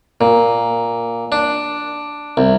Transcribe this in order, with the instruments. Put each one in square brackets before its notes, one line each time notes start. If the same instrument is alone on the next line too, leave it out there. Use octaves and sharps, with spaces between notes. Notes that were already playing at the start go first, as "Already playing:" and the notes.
[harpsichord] A#2
D4
C2